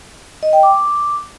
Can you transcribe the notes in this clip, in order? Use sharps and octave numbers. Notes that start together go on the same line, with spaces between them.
D#5
G5
D6